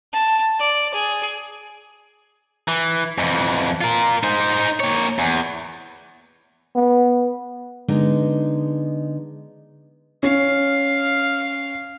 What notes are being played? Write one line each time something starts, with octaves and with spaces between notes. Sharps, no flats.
A5
D5
G#4
E3
F2 E3
F4 A#4
D#4 C5
A#3 C#5
E2
B3
D3 G#3 B3 D#4
C#4 F5